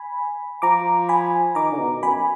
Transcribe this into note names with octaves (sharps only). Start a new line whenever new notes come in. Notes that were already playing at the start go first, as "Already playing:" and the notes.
Already playing: G#5 B5
F3 A#5 D6
G#5 B5
D#3 A#5 D6
D3
B2
F#2 G#5 B5